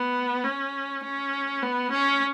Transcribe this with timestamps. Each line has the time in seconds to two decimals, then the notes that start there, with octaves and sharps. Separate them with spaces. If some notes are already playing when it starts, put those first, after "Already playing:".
Already playing: B3
0.44 C#4
1.04 C#4
1.62 B3
1.92 C#4